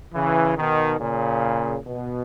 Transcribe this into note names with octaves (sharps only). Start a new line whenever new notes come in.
C#3 E3
B2 D#3
A#2 C#3
B2